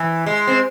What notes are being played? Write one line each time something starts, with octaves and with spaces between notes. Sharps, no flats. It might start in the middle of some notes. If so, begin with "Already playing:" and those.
Already playing: E3
G#3
C4